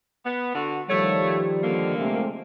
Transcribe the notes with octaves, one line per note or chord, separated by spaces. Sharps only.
B3
D3 F#4
D#3 F3 G3 A3 C#5
D3 A#3
C3 G#3 A3